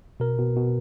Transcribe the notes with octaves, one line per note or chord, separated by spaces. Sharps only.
B2 A#4
B2
B2